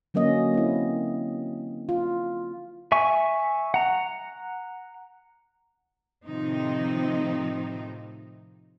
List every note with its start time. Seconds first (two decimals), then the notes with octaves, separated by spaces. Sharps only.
0.14 D3 F#3 A#3 C#4 D#5
0.54 C4 E4
1.89 F4
2.92 E5 G#5 C#6
3.74 F#5 A#5
6.27 A2 C3 D#3 F3 C4 D#4